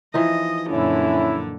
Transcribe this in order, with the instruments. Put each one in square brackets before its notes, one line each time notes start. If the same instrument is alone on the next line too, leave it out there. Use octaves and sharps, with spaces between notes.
[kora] E3 F3 D#4 [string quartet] D#5
[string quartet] F#2 A#2 D3 [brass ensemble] C#4 E4